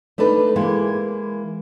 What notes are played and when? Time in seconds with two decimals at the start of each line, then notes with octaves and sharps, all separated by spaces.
0.18 A3 D4 D#4 A4 B4
0.56 E3 G#3 A#3